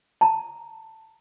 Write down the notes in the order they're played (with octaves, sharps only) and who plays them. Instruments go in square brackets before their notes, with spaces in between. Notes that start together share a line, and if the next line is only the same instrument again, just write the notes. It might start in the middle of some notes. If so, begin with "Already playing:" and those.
[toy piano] A5 A#5